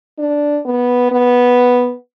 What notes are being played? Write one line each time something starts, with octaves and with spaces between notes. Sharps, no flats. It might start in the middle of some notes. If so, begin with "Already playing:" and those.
D4
B3
B3